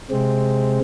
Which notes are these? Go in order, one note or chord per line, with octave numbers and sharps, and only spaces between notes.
C3 G#3 C4